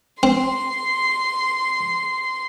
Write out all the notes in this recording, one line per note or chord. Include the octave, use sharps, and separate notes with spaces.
C4 C6